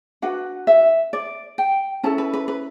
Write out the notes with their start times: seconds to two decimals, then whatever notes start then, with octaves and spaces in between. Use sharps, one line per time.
0.22 D4 F#4 B4 F#5
0.67 E5
1.13 D5
1.58 G5
2.03 C#4 E4 A4 A5
2.18 B4
2.33 B4
2.48 B4